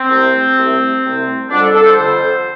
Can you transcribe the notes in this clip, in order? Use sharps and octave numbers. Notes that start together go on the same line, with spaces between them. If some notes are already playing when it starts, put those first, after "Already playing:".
Already playing: C4
C2 C3 A3
C2 C3 A3
C2 C3 A3
F2 D3 G3 D4
A4
A4
C5
F2 D3 G3